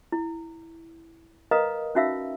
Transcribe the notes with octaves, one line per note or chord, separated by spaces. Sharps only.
E4
A#4 B4 D#5 F5 A#5 D#6
C#4 D#4 F#4 E5 F5 E6